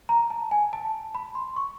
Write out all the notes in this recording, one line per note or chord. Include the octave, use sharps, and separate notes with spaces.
A#5
A5
G#5
A5
B5
C6
C#6